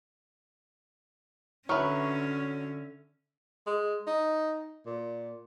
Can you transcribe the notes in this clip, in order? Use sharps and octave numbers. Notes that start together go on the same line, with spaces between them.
D3 F#3 C#4 B4 E5 C#6 F6
G#3
D#4
A#2